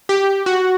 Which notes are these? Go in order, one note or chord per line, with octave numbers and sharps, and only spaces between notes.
G4
F#4